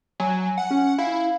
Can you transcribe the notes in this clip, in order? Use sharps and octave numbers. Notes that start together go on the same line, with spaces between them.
F#3 G#5
F#5
C#4
E4 F5